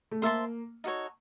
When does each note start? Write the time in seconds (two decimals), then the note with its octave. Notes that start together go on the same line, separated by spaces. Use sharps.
0.11 A3
0.22 A#3 C5 E5 A5 C6
0.84 D#4 F#4 A4 C#5